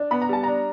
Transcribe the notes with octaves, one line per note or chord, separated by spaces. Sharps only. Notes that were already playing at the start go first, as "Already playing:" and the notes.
Already playing: D4
B3 B5
A#5
G3 A5
D4 A#5